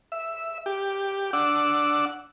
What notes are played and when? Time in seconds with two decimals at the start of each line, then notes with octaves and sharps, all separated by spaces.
0.12 E5
0.66 G4
1.33 D4 F#5 D6 E6